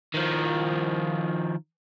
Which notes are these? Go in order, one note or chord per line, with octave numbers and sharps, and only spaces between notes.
D#3 F3